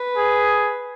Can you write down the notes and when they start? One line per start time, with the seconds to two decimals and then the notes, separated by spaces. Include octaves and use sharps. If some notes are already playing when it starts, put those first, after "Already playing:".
Already playing: B4
0.17 G#4